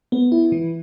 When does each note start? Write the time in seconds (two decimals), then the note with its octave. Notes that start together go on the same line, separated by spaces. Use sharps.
0.12 B3
0.32 E4
0.52 E3